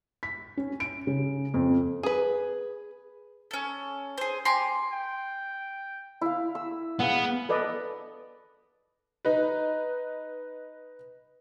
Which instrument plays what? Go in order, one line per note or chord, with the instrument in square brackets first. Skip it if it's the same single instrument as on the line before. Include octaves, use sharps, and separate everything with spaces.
[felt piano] B6
C#4
D7
C#3
F2
[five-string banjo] G#4 B4
[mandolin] C#4 A4
G#4 C5
G4 G#5 A#5 C6
[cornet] G5
[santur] E4 F5
E6
[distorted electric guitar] B3 [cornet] G#4 [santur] F5 F#5
[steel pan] A4 B4 D5 D#5
[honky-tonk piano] D#4 B4